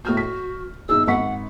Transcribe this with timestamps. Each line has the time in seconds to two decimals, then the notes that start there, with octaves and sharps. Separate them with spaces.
0.05 A2 F#4 F6 G6
0.17 B6
0.89 G1 D#4 G#4 E6
1.07 G#1 F#5 C#6 B6